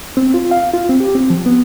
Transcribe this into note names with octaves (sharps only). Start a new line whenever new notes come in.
C4
F4
F5
F4
C4
G4
C4
F3
B3